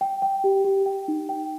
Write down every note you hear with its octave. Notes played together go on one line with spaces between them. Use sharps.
G5
G5
G4
G4
G5
D#4
G5